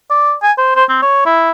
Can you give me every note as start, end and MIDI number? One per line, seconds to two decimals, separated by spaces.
0.10 0.33 74
0.42 0.52 80
0.58 0.73 72
0.76 0.84 72
0.89 0.98 60
1.02 1.24 73
1.26 1.51 64